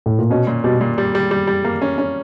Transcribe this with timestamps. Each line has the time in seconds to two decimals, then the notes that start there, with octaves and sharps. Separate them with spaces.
0.06 A2
0.18 A#2
0.30 B2 C#4
0.47 A#2
0.64 B2 G3
0.81 A#2
0.98 G3
1.15 G3
1.31 G3
1.47 G3
1.65 A#3
1.82 C#4
1.98 C#4